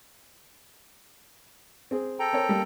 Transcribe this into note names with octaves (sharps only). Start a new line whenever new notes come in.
C4 G#4
A4 G5 A#5
C4 A#4 C#5
G3 A#3